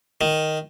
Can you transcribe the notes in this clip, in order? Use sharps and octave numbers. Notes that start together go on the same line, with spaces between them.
D#3